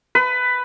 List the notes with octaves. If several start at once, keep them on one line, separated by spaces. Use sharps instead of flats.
B4